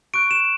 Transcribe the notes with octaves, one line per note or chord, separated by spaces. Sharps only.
C#6 F#6 D7
E7